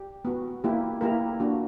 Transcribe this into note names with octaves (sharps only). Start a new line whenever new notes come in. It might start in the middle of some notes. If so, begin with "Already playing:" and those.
Already playing: G4
B3 F#4
A#3 E4 G4
A#3 E4 G4 A#4
A#3 D4 F#4